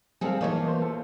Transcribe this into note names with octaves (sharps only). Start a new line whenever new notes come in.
D#2 G3 C4 G#4 A4 F5
E3 A#3 D#4 F4 C#5 A5
B3 C5
A4